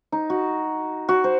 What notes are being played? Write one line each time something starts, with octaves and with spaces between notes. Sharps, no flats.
D#4
F#4
F#4
C5